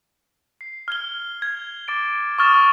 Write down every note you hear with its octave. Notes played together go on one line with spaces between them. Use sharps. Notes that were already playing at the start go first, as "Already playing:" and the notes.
C7
F6 G#6 G7
G#6
D6 A6 D7
C#6 D#6 F6 A6 E7